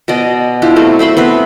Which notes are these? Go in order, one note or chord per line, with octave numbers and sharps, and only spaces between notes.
B2 D5 D#5
D4 E4 F4 G4
F#3 A3 C4
C5 E5 B5 C6
B3 C4 B4